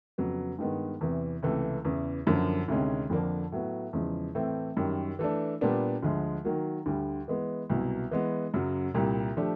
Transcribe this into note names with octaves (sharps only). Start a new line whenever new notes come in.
F2 C#3 F#3 B3
G2 D#3 G#3 B3
E2 C3 E3
C#2 C3 E3 A3
E2 C#3 E3
F#2 D3 F3 A#3
D2 C3 D#3 G#3 C#4
F2 D3 F3 A#3 D4
A2 F#3 B3
E2 C#3 F3 G#3
A2 E3 A3 C4
F#2 D#3 G3
E3 A3 D4
A#2 G3 B3 D4
D2 D3 F3 G#3
D#3 F#3 A#3
D2 D3 G3
E3 G#3 B3
C2 B2 F#3
E3 G#3 B3
F#2 C#3 F#3
C2 A#2 G3
F3 A3 D4 G4